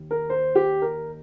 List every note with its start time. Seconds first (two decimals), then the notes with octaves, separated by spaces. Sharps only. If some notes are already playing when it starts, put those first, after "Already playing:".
Already playing: D#2 D#3
0.11 A#4
0.30 C5
0.55 G4
0.82 A#4